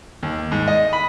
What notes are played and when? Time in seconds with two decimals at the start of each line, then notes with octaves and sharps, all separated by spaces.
0.23 D#2
0.52 G#2
0.68 D#5
0.93 B5